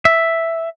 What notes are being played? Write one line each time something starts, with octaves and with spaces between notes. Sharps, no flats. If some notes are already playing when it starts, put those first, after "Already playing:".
E5